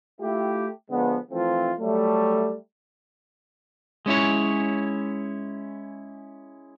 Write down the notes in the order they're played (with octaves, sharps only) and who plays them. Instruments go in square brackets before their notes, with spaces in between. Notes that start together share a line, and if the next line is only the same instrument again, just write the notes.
[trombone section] A3 E4 F4 G4
D3 F3 G#3 B3
E3 F3 A3 C4 F4
F#3 G3 A3
[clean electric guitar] G#3 C#4 E4 C#5